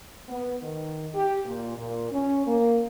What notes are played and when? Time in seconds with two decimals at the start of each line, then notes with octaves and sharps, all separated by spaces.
0.29 B3
0.62 D#3
1.14 G4
1.45 A#2
1.77 A#2
2.12 C#4
2.46 A#3